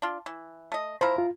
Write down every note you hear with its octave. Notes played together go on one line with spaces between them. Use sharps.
D4 F4
E3
A3 D#5
F3 E4 A#4 C5 B5
F4